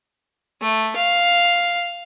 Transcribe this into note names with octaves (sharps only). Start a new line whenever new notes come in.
A3
F5